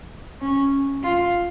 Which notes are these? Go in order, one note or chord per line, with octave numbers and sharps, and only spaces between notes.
C#4
F4